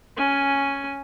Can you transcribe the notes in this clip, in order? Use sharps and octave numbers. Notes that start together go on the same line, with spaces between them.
C#4 G#5